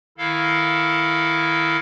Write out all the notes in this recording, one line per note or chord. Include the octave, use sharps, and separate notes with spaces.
D#3 E4 A4 F5